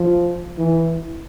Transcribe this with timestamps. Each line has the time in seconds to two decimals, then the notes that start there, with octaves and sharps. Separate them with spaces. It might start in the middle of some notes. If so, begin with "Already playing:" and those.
Already playing: F3
0.59 E3